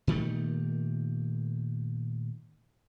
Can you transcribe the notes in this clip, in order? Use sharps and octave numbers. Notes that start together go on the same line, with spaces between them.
A#2 D#3 G3 A3